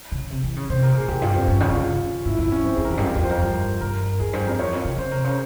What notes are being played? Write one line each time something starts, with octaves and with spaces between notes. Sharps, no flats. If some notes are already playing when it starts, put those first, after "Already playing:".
C#3
C3
E3
C#3
C3 C5
A#4
A#2
G#4
E2 G4
G2 F4
F2 C4
G2 C#4
C#3 F4
C#3 F4
G#2 E4
F2 E4
C#4
F2 C4
G#4
F2
A#4
E2
G4
G2
F2 F4
E2 G4
C5
F2 A#4
G2
G2 A#4
E2 G#4
G2 C5
F2 A#4
E2 C#5
F2
C#3
C#3 C5
C3 A#4
C#3 C5